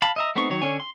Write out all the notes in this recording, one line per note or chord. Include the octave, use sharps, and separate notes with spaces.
F5 A5 B5
D#5 E5 A#5
A3 B3 C4 D#4 C#6
D#3 F#3 C#5
D3 C#4 C#5 G#5
C6